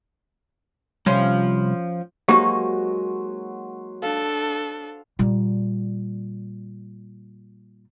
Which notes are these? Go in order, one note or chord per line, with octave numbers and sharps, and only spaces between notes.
C3 F3 G3 C#4 F4
F#3 G#3 A#3 D#4 G4 C5 C#6
D4 A4 F5
A#2 G3